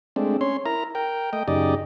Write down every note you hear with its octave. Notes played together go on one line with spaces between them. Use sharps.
G#3 A3 C4 D4
C#4 C#5 C6
E4 A#4 A#5
A#4 G5
A3 D#5 G5
F#2 C#3 D#4 G4 D5 D#5